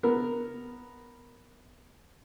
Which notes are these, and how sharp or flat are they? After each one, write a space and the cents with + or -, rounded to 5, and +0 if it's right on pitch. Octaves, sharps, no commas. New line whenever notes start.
B3 +0 A#4 +0